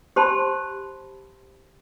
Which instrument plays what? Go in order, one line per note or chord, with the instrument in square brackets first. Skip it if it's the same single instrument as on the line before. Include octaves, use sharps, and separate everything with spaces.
[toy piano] G4 C5 A5 B5 C6